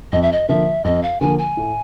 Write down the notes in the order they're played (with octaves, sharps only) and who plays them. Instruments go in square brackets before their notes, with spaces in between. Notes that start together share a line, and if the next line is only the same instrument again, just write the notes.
[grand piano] F2 [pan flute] D#5
[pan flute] E5
D#5
[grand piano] D3 F3 A#3 [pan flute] E5
[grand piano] F2 [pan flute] D#5
[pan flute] F5
[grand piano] D3 F3 A#3 [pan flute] G#5
[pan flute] G#5
[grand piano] A2